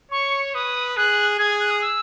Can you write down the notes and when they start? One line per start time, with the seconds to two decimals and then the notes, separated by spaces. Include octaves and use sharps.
0.11 C#5 C#6
0.55 B4 D#6
0.97 G#4 F#6
1.39 G#4 G#6
1.60 F#6
1.70 D#6
1.81 E6